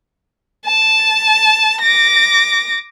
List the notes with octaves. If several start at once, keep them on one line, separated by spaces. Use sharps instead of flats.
A5
D6 A#6